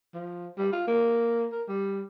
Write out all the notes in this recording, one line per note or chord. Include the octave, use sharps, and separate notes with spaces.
F3
G3
F4
A#3
A#4
G3